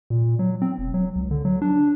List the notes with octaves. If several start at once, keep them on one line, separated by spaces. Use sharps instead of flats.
A#2
F#3
C4
E1
F#3
C#2
D3
F#3
D4